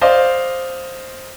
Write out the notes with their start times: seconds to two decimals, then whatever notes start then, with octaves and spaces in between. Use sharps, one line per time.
0.01 C5 D5 D#5 F5